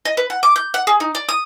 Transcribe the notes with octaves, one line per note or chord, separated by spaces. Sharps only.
D#5
B4
F#5
D6
G6
F#5
G#4
D#4
D5
D#6